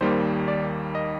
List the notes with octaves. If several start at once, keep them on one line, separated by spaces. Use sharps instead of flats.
D#2 D#3 G3 A#3 C5
D5
D#5